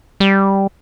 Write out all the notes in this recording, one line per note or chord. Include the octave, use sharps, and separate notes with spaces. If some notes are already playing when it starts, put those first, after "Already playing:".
G3